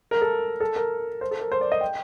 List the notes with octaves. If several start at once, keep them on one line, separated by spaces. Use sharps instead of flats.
A#4
A4
A4
A#4
C5
A4
A#4
C5
D5
D#5
G5